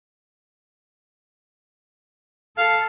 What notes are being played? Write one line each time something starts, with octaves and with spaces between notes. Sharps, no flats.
A4 F5